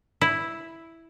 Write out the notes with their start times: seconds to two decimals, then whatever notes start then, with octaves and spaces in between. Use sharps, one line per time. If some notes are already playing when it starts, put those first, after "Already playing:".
0.21 E4